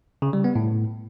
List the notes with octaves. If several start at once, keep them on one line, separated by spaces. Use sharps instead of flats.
C#3
G3
B3
A2